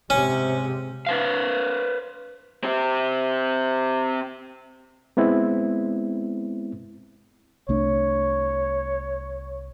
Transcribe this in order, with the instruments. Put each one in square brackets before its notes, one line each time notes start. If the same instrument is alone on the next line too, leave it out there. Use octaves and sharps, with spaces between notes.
[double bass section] G#2 C3 [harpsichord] C#4
[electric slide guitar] B4 C5 F5
[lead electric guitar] C4 G4
[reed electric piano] G#3 B3 C4 E4
[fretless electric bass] C2 A3 D4 [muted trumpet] C#5